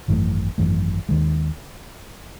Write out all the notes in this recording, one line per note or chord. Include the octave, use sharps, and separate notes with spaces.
G#1 F#2 E3 A3
G#1 F#2 E3 A3
D#2 D#3 G#3